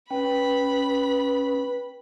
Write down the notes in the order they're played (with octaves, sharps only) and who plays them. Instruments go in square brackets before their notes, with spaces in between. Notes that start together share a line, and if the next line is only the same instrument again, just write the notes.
[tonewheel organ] C#4 [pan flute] B4 [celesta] G5 [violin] B5